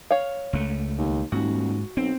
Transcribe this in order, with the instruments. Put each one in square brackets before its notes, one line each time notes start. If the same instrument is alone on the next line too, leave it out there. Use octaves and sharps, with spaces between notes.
[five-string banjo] C#5 F5
[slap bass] C#2 A3
[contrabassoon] D#2
[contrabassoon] D#1 [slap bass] G#2 [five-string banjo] F#4
[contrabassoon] B1 [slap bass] C4